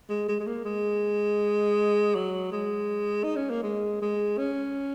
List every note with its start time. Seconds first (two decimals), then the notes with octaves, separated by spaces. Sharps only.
0.09 G#3
0.28 G#3
0.40 G#3
0.47 A#3
0.65 G#3
2.15 F#3
2.52 G#3
3.24 D#4
3.36 C#4
3.50 A#3
3.63 G#3
4.02 G#3
4.38 C#4